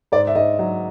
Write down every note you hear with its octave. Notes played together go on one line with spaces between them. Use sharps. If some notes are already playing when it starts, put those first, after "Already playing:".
G#2 D5
E5
G#2 D#5
F#3